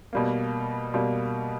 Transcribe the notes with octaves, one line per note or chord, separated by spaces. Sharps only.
B2 G3 A#3
B2 G3 A#3